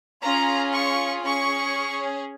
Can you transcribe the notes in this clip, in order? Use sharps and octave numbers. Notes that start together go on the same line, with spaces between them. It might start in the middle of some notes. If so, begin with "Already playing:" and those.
C#4 F4 G#4 A#5
C#6
C#4 G#4 C#6